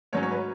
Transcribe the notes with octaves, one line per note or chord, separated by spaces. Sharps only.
G#2 F#3 C#4 C#5
C#5
B4